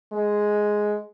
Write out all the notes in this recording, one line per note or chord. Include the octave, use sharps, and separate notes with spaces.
G#3